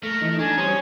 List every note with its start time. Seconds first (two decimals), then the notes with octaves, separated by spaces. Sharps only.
0.03 A3 A#4
0.22 E3 D#4
0.40 D4 G#5 A#5
0.58 G3 C#4 C5 D#6